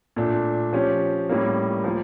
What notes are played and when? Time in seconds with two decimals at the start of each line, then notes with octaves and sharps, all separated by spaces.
0.16 A#2 A3 D4
0.73 F3 C#4 G4
1.29 A2 G3 A#3 C#4
1.84 F3 A#3